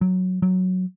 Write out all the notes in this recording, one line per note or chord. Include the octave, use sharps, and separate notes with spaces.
F#3
F#3